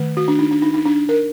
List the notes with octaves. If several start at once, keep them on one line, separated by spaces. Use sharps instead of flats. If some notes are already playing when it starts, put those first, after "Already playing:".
Already playing: D#3 A3
F#4
D4
D#4
D4
D#4
D#4
D4
A#4